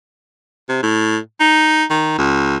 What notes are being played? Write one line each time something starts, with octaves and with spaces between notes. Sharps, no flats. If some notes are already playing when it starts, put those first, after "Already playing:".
C3
A2
D#4
D#3
C#2